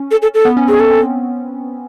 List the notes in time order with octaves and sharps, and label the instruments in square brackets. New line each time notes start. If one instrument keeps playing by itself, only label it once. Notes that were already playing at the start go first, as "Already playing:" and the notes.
Already playing: [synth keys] C#4
[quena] A4
A4
A4
[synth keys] B3
C#4
[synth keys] C4 [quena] G#4
[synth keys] C#4 [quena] A4
[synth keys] C4